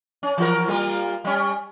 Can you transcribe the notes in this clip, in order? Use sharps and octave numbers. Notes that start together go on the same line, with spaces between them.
C#4
E3 F#4 A#4
G3 A#3 F4
G3 C#4